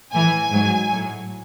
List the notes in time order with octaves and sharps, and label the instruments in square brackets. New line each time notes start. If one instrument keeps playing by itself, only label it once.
[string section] A2 E3 G#5
G#2 F#3
A2 F#3